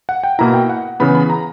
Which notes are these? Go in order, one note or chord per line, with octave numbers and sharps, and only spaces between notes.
F#5
G5
B2 A#3 E4 A#5
G5
F#5
C#3 E3 B3 B5
B5
A#5